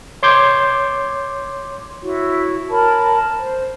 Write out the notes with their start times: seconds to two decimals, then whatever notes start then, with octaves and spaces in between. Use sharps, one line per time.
0.23 C#5 C6 D6 G6 G#6
2.03 E4 F#4 C#5
2.70 A#4 C#5 A5 B5
3.38 C5